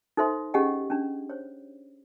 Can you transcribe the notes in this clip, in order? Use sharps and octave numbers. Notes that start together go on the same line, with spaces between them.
D#4 A4 C5 E5 C6
C#4 G4 G#4 D#5 F#5 G#5
C#4 D4
C5 C#5